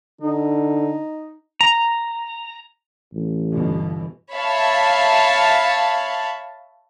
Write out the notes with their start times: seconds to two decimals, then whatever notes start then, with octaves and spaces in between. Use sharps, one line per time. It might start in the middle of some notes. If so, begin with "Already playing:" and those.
0.21 D3 D#4
1.61 A#5
3.13 A1
3.52 G1 B2 E3
4.34 C#5 E5 F5 A5 B5